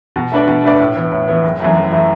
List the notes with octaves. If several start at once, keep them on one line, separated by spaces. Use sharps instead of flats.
B2
A3 D4 B4 D5
B2
A3 D4 B4 D5
A2
E3 B3
A2
E3 B3
F#1
F#2 E3 A3
F#1
E3 A3